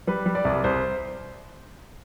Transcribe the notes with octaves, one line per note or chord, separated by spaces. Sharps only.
G3 B4
G3
D5
C2
C2 C5